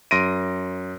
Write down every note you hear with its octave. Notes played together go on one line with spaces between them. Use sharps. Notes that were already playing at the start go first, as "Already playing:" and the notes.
F#2 C6 A#6 D7 D#7